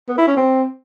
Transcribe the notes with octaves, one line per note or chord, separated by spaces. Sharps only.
B3
E4
C#4
C4